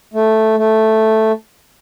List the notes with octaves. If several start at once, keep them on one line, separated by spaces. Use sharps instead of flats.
A3
A3